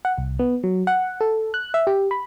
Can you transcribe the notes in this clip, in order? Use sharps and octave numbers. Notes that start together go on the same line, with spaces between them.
F#5
C2
B3
F#3
F#5
A4
F#6
E5
G4
B5